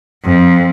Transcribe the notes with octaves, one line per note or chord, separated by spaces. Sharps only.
F2